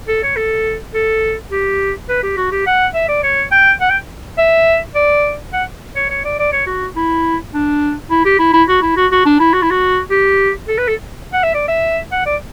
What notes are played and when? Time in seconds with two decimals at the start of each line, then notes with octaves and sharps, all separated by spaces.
0.08 A4
0.23 C#5
0.37 A4
0.95 A4
1.52 G4
2.09 B4
2.23 G4
2.37 F#4
2.52 G4
2.67 F#5
2.94 E5
3.09 D5
3.23 C#5
3.52 G5
3.81 F#5
3.90 G5
4.38 E5
4.95 D5
5.53 F#5
5.96 C#5
6.10 C#5
6.25 D5
6.39 D5
6.53 C#5
6.67 F#4
6.96 E4
7.54 D4
8.10 E4
8.25 G4
8.39 E4
8.53 E4
8.68 F#4
8.82 E4
8.97 F#4
9.11 F#4
9.26 D4
9.40 E4
9.53 F#4
9.63 E4
9.71 F#4
10.10 G4
10.68 A4
10.78 B4
10.88 A4
11.33 F#5
11.43 E5
11.54 D5
11.68 E5
12.12 F#5
12.26 D5